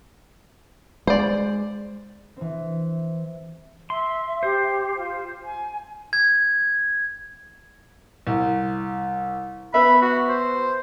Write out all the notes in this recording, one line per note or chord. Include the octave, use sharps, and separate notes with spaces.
G#3 C5 D5
E3 C4
E5 C6
G4 C5
F4
G#5
G#6
C2
B3 E5 B5
F#4
C5